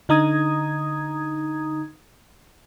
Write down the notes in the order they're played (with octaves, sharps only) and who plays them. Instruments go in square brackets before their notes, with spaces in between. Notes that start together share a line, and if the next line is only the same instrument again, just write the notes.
[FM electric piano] D3 D#4 A#5 D#6 G#6